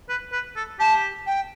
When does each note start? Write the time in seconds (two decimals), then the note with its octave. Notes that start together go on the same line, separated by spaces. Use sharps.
0.09 B4
0.32 B4
0.56 A4
0.79 G4 A5
1.26 G5